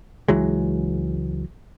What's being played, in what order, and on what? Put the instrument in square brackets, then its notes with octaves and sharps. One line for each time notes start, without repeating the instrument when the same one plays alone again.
[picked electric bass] C#2 E3 F#3 G#3